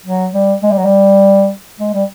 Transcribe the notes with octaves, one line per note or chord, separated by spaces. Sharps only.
F#3
G3
G#3
G3
F#3
G3
G#3
G3